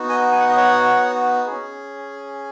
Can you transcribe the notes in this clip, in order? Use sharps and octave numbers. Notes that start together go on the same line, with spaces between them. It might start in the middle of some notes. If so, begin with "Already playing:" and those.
Already playing: B3 D#4 F#4
D#5 G#5
G#5
F#5
D#5
C#5 F#5
C#4 G#4